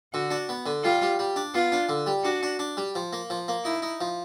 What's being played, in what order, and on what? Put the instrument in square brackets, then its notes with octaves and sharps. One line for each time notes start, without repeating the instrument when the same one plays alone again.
[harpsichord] D3 [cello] F#4
[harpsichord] D4
B3
D3
[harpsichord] G3 [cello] F4
[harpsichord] G3
G3
D4
[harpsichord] B3 [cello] F4
[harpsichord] D4
D3
G3
[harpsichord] D4 [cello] F#4
[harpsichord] D4
D4
G3
F3
A#3
F3
A#3
[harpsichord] D#4 [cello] E4
[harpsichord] D#4
F3